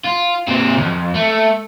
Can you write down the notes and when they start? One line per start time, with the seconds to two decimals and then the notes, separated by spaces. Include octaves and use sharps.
0.05 F4
0.47 A#2 C4
0.78 C2 F2
1.15 A3